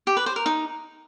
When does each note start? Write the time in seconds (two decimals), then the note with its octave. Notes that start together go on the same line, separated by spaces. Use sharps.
0.07 G4
0.17 B4
0.26 C5
0.36 A#4
0.46 D#4